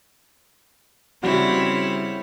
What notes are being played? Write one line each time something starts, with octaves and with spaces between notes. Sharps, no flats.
C#3 G3 C4 E4 F#4 C#5